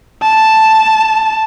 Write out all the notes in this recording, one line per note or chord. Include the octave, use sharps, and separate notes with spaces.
A5